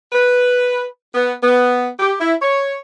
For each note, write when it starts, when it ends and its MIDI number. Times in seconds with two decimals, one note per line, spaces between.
0.12 0.84 71
1.13 1.32 59
1.41 1.87 59
1.98 2.12 67
2.19 2.32 64
2.41 2.76 73